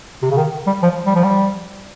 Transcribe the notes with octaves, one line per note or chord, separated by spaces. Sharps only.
C3
C#3
D#3
G3
F3
G3
F3
G3